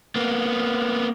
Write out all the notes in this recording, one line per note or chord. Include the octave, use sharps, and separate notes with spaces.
A#3 B3